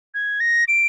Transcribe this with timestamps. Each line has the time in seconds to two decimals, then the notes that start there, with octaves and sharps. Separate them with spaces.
0.14 G#6
0.40 A#6
0.68 D7